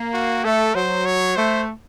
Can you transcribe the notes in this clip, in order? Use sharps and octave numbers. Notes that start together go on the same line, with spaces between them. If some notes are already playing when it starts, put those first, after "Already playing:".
Already playing: A#3
F#4
A3 A4
F#3 C5
C#5
A3 C5